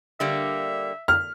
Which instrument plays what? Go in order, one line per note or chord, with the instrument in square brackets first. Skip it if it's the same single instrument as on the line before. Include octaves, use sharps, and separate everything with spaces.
[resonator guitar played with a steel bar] D3 G3 A#3 [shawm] E5
[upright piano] F6